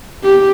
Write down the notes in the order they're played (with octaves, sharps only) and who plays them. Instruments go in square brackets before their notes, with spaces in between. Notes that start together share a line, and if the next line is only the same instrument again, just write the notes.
[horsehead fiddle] G4